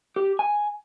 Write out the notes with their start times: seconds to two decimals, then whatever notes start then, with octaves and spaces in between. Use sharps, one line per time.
0.16 G4
0.39 G#5